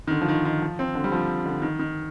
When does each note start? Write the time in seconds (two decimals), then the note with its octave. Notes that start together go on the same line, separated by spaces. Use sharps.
0.07 D#3
0.11 D3
0.22 F3
0.28 D#3
0.45 D#3
0.62 F3
0.79 C4
0.95 D3
1.04 G3
1.12 F3
1.46 D3
1.62 D#3
1.79 D#3